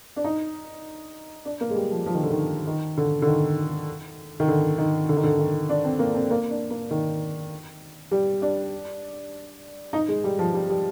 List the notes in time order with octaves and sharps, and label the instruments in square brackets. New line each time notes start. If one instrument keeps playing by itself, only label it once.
[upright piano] D4
D#4
D4
A#3
G#3
G3
F3
F3
D#3
D3
D#3
D#3
D3
D3
D#3
D#3
D3
D#3
D3
D#3
D3
D#3
D4
C4
A#3
C4
A#3
D4
A#3
D#3
G3
D4
D#4
G#3
G3
F3
G3
G3